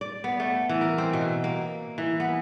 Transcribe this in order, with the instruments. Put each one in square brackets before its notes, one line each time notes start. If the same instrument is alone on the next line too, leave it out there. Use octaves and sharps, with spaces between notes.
[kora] D5
B3
A3
E3
A#4
C4
B2
A#3
E3
B3